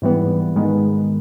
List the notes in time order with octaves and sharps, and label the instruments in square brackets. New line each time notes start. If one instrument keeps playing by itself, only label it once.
[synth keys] G#2 E3 G3 B3
G#2 D#3 G#3 B3